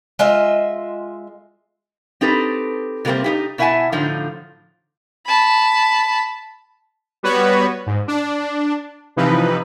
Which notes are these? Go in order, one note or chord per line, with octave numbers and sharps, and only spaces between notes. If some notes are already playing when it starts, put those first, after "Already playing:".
G#3 F4 D#5 E5
C4 D#4 G4 A4 B4
C3 F#3 G3 A3 A#3 C4
D#4 E4 G4
B2 E4 E5 F#5 G#5 A5
A2 D3 F3 D#4 F4
A5 B5
G3 B3 F#4 B4 C#5
G#2
D4
C3 E3 F3 D#4 B4